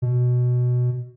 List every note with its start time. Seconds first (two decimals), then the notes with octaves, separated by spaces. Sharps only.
0.02 B2